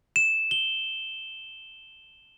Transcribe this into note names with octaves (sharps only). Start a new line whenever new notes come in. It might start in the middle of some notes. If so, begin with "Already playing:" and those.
E7
G7